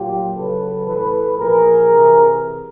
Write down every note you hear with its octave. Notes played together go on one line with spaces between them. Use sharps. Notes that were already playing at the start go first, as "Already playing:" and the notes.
Already playing: A#2 F#3 F4 G4
C#3 F#3 A4 B4
A2 E3 A4 B4
A#2 F3 G#4 A#4
C3 E3